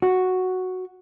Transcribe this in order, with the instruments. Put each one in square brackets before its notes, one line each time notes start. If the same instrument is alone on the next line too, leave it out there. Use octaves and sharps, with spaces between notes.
[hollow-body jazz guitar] F#4